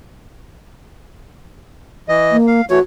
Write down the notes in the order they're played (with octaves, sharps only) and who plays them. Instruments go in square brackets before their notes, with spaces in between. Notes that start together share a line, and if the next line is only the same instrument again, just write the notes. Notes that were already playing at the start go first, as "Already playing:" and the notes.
[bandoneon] E3 D#5
[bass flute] A#3
[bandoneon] F5
[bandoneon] E3 A3 C#5 [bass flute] F#4